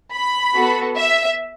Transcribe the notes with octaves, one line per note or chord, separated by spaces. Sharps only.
B5
B3 F#4 A4
E5